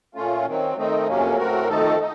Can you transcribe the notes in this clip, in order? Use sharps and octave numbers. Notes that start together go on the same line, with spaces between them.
A#2 A3 C#4 F4
D#3 F#3 C4
D#3 A3 C4 D#4
F2 C3 F#3 A#3 C#4
A2 A3 C4 F#4 A#4
F2 D#3 A3 D#4 A4
D#4